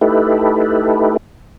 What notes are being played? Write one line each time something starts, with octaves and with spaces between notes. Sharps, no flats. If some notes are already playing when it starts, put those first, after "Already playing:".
A3 D#4 E4 G4 A4 B4